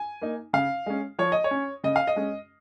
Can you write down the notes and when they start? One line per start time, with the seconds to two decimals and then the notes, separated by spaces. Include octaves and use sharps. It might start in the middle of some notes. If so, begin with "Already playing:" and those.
Already playing: G#5
0.22 A#3 D#4
0.53 C#3 F5
0.86 G#3 C#4
1.19 F3 C#5
1.32 D#5
1.44 C#5
1.51 C#4
1.84 C#3 D#5
1.96 F5
2.07 D#5
2.16 G#3 C#4